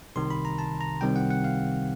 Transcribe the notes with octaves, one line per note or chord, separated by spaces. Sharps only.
C2 C3 D#3 C6
B5
A#5
A5
A#5
C2 C3 D#3 G3 C4 G5
F#5
F#5
F5